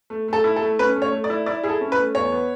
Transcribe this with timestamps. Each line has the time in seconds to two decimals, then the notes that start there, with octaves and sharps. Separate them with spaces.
0.10 A3
0.28 A3 A4
0.44 E4
0.56 A4
0.62 A3
0.79 C#4 B4
0.96 A3
1.02 C#5
1.12 A3
1.24 D5
1.30 E4
1.46 E4 D5
1.64 E4 G#4
1.69 A4
1.81 C#4
1.92 B4
1.98 A3
2.15 E2 C#5
2.32 B3